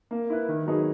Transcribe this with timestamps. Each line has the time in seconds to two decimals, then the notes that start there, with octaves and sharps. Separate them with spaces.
0.11 A#3
0.30 E4 B4
0.49 D#3
0.66 F#3 B3 D#4 G#4